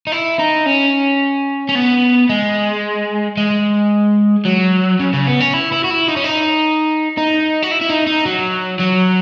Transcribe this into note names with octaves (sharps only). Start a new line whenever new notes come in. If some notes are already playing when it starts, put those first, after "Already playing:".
D#4
E4
D#4
C#4
C#4
B3
G#3
G#3
F#3
C#3
C#3
B3
C#4
E4
E4
F#4
E4
D#4
C#4
D#4
D#4
F#4
E4
E4
D#4
D#4
F#3
F#3